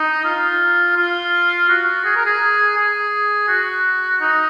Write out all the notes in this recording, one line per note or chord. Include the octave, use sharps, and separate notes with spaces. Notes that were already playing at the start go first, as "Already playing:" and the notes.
Already playing: D#4
F4
F4
F#4
G#4
A#4
G#4
G#4
F#4
D#4